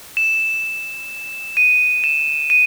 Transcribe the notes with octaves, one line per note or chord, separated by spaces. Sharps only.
E7
D#7
E7
D#7